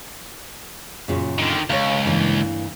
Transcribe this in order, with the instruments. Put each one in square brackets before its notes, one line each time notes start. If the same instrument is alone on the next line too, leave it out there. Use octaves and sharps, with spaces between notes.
[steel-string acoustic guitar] F#2 A#2 C#3
[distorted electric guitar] D3 D#3
[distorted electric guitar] C#2 [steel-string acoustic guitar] C#5 F5
[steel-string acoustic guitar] G2 E3 A#3